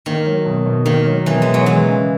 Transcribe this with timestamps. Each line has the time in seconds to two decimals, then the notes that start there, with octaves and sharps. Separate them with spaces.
0.06 D#3 A#3
0.25 F#3
0.46 B2
0.65 B2
0.86 D#3 A#3
1.06 F#3
1.26 B2 E3
1.42 B2 G#3
1.54 F#3
1.66 E3 G#3
1.86 C#3